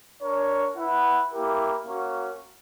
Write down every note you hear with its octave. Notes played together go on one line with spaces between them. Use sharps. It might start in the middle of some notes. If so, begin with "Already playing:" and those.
D4 A#4 C#5
E4 B4 F#5
A#3 E4 G4 A#4
A#3 C#4 F#4